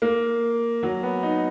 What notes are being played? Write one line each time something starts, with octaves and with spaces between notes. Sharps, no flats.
A#3
F#3
B3
D#4